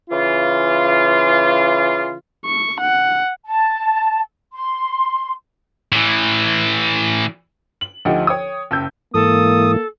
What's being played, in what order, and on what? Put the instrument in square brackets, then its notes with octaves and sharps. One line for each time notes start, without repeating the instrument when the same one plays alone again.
[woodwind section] C#3 E3 F4
[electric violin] C#6
F#5
[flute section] A5
C6
[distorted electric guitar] A2 E3
[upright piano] F#7
D2 F3 D#4 G4 F#5
C#5 G5 D#6
F#1 E6 G6
[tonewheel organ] G#2 E3 [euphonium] A#3 [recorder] A4 [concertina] D#6